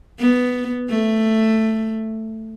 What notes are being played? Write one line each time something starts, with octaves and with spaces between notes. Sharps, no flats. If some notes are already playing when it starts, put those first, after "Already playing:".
B3
A3